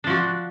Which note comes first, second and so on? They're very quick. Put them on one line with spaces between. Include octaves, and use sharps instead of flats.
D4 F3 F#4